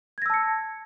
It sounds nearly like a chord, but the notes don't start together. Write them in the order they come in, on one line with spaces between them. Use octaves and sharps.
G#6 A#6 E6 A5 C#7